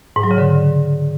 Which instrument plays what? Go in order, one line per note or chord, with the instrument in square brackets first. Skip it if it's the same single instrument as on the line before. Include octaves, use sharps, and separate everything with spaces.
[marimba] G#2
F#3
C#3
D3